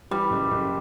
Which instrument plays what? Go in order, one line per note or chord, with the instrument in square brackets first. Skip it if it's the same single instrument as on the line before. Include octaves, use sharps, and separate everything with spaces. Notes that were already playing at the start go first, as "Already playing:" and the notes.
[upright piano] E3 [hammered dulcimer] G3
[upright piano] F#1
F#1